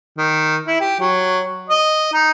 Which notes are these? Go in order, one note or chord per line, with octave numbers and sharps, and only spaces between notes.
D#3
E4
G4
F#3
D#5
D#4